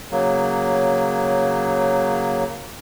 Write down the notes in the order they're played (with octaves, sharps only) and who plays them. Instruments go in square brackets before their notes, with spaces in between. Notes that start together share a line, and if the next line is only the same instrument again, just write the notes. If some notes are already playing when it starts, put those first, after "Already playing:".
[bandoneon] C#3 F#3 A#3